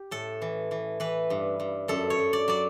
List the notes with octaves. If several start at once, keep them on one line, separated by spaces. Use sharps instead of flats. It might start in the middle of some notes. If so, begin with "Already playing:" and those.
Already playing: G4
A2 A4
E3
E3
E3 B4
G2
G2
F#2 A4
C#5
F#2
D5
F#3 D5